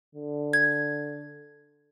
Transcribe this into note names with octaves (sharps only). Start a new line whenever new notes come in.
D3
G#6